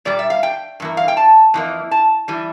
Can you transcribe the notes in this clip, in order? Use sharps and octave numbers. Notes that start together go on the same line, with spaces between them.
A#2 G3 D5
E5
F5
G5
G2 E3 A#3
F5
G5
A5
F2 E3 A#3
A5
E3 G3